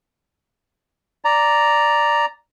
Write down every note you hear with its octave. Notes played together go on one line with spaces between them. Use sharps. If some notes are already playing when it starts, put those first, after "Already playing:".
D5 A#5